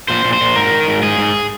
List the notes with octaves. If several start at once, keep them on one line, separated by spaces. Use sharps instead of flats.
A#2 C5
A#2
C5
A#2
G#2 A#4
D#3
G#2
G#2 G#4
G#2